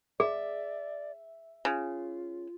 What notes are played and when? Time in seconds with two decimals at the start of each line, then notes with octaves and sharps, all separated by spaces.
0.20 G#4 D5 E5
1.65 C#3 F4